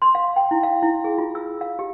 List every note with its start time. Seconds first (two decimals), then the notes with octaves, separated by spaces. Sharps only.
0.02 C6
0.15 F5
0.36 G5
0.51 E4
0.63 F5
0.82 E4
1.04 G#4
1.18 F4
1.35 E6
1.61 F5
1.79 G4